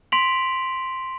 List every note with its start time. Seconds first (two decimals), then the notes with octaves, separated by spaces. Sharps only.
0.12 C6 B6 D7 F7 F#7